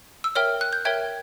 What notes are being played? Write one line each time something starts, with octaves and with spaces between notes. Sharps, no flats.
E6
A#4 C#5 E5 G5 F6
F#6
G6
A#4 C#5 E5 G5 G#6